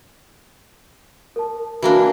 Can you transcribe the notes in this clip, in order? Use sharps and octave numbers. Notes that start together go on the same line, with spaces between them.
A#4 A5
E3 A#3 D4 F#4 B5